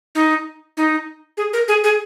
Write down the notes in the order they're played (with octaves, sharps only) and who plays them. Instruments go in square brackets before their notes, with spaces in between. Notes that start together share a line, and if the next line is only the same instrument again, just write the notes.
[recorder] D#4
D#4
G#4
A#4
G#4
G#4